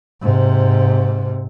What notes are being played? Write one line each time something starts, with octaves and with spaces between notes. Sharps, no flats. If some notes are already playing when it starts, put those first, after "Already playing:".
G#2 C3